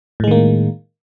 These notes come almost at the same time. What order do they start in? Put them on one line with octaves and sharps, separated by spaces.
A2 G#3 D#3 A#3